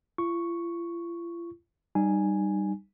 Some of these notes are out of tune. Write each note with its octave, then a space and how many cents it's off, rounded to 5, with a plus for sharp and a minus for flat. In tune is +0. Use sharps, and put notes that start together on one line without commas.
F4 -45 C#6 +0
G3 -5 D#4 -25 G#5 +0